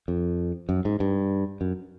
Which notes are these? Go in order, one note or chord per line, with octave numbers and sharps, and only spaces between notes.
F2
F#2
G#2
G2
F#2